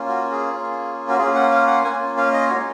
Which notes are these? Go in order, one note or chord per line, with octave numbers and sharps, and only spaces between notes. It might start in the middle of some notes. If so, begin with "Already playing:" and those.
Already playing: A#3 C#4 F4
F#4
G#4
A#3 C#4 F4
F#4
A#3 C#4 F4 G#4
F#5
F5
F#5
A#3 C#4 F4 G#5
F5
D#5
G#3 D#4 F#4 C#5